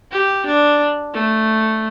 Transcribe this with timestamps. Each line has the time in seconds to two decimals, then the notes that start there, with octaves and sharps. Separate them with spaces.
0.12 G4
0.46 D4
1.13 A3